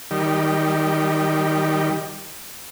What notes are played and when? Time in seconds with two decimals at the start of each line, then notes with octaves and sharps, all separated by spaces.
0.11 D#3 G3